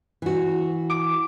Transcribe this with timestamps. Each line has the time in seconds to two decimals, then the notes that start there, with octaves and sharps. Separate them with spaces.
0.22 E3 F#4
0.90 D6